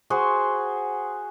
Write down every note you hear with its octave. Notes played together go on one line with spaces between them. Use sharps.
F#4 G#4 C5